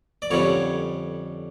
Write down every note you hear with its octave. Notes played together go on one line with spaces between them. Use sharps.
D5
F2 D3 G3 C#4 C#5